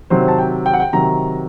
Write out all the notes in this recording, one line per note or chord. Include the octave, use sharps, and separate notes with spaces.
C3 D#3 F#3 C5
A5
G5
G5
F#5
G5
C3 D#3 F#3 A#5